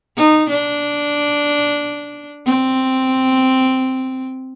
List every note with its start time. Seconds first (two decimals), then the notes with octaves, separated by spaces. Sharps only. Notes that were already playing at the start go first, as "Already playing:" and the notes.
0.16 D#4
0.49 D4
2.46 C4